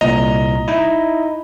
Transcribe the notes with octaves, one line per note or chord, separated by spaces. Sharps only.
C2 A#2 D#5 A#5
D#4 E4